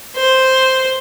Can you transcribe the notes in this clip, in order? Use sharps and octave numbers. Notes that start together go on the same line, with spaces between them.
C5